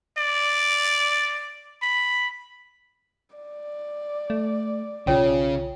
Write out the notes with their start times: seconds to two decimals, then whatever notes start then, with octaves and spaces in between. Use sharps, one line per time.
0.17 D5
1.82 B5
3.35 D5
4.30 A3
5.07 B1 C#3 F4 C#5 G5